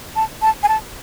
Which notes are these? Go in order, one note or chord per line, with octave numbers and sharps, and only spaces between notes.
A5
A5
G#5
A5